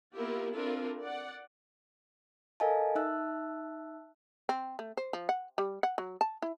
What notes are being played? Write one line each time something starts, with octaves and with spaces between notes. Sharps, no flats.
A#3 B3 E4 F4 G4 A#4
C4 D4 E4 F4 A4 A#4
D5 F#5
A4 A#4 D#5 F5 G#5 A5
D#4 E5 A5 E6 F#6
C4
A3
C5
F3
F#5
G3
F#5
F#3
A5
E4